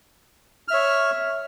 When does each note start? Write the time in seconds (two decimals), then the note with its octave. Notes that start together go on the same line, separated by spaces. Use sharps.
0.68 F6
0.71 E5
0.73 C#5